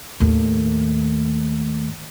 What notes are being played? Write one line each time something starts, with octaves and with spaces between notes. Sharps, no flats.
D#2 A2